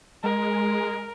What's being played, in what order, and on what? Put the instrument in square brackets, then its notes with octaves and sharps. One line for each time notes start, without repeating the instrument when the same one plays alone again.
[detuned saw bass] G#3 [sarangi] A#4